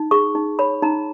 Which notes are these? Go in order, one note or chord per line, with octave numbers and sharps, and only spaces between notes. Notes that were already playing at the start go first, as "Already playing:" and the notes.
Already playing: D#4
G#4 C#6
D#4
C#5 B5
D#4 A#5